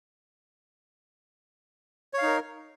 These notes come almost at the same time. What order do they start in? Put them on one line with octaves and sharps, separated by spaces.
C#5 F5 D#4 A#4